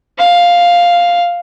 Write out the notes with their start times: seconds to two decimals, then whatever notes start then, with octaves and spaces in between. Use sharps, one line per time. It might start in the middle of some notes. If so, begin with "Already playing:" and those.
0.19 F5